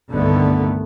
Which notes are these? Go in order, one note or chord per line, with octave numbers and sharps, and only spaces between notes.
C2 G2 D3 D#3 A3 B3